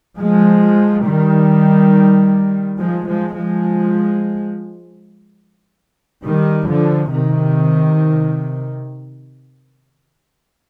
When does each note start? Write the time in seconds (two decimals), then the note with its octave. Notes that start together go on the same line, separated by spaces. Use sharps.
0.19 F3 G#3
1.05 D#3 G3
2.79 F3 G#3
3.07 F3 G#3
3.37 F3 G#3
6.25 D#3 G3
6.68 D3 F3
7.11 C3 D#3